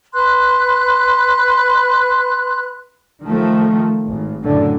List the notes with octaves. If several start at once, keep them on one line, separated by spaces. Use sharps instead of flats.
B4 C6 F#6
D#3 F3 A3
G#1
F#2 A2 D3